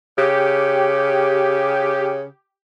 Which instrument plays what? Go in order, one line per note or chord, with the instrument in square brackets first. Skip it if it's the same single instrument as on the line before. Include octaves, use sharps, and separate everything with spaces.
[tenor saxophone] C#3 [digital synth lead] G4